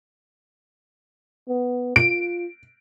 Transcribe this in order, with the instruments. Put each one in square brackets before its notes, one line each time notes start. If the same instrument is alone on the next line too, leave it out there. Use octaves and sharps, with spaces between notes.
[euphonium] B3
[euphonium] F4 [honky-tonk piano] D7